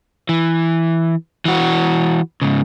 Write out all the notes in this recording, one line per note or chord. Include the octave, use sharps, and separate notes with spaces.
E3
E3 F#4
G#2 C#3